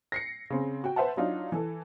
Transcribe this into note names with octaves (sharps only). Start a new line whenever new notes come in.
A#6 C7 C#7
C#3 C4
F#4 G5
B4 C5 E5 F#5 A5
F#3 D4 D#4 F4
E3 A4